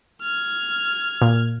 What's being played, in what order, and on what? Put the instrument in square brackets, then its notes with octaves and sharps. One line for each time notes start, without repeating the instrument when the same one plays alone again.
[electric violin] F6 G#6
[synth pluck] A#2